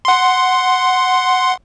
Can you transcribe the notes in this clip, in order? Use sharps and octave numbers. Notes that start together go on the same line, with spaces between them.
F#5 C6